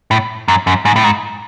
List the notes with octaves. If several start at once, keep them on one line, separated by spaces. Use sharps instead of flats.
A2
F#2
F#2
G#2
A2
G#2